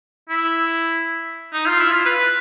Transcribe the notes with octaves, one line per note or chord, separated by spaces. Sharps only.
E4
D#4
F4
E4
F4
B4